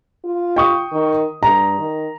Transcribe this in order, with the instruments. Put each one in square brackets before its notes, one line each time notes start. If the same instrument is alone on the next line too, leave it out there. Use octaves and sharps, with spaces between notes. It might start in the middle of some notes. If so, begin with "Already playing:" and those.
[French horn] F4
[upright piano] G5 C#6 D#6
[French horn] D#3
[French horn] G2 [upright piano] A#5
[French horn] D#3